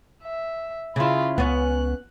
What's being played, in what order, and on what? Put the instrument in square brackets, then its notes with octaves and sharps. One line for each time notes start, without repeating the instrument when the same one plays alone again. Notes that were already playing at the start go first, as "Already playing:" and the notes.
[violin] E5
[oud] C#3 E4 [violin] F4 B5
[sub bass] C#2 [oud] B3 C#4 [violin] F#6